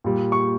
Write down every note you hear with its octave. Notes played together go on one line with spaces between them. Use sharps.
A#2 G3
C#6